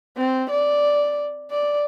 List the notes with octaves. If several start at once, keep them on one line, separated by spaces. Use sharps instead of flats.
C4
D5
D5